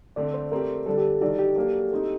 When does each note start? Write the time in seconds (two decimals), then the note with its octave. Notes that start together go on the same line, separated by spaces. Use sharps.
0.16 D3 A3 C4 D5
0.34 C5
0.51 A3 C4 G4 A#4
0.86 D3 G3 D4 A4
0.98 G4
1.21 D#3 G3 D4 F#4 A4 D5
1.39 G4
1.56 F#3 A#3 D4 F#4
1.91 A3 C4 D#4